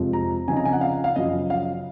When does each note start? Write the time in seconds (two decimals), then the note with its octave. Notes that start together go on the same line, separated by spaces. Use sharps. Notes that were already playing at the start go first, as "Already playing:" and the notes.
Already playing: F2 C3 F3 G#3
0.13 A#5
0.48 C#3 F3 C4 D#4 G#5
0.57 A#5
0.65 G#5
0.73 F#5
0.81 F5
1.04 F5
1.16 F#2 C#3 F3 D#5
1.50 F5